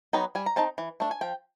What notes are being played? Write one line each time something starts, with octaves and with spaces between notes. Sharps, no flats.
F#3 B3 D#4 G5
G3 G#5
A#5
C4 D#4 A5
E3
A3 D4
G#5
F3 G5